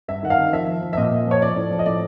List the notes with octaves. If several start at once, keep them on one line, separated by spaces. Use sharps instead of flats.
G2 E5
D#3 F#5
F5
D#3
F3 E5
F3
F3
E5
A#2 D#5
A#2
F3 C#5
F3 D5
A2
F3
D#5
A2 D5